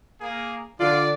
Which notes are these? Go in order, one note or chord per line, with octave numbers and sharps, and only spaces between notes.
A#3 G#4
D3 D4 F4 D5